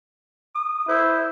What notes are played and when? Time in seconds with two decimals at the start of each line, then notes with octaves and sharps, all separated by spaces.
0.55 D#6
0.88 E4 C5